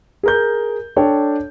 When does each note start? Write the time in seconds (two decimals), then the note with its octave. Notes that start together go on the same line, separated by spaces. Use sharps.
0.23 G#4 A#4 G6
0.96 D4 A4 C#5 G5